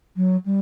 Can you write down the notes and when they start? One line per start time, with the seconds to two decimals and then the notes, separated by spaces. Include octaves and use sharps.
0.16 F#3
0.45 G3